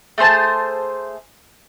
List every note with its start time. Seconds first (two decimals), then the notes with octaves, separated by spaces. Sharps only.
0.18 A3 G#4 C5 A5